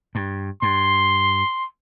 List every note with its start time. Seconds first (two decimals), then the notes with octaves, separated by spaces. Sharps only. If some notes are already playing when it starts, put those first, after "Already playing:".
0.15 G2
0.62 G2 C6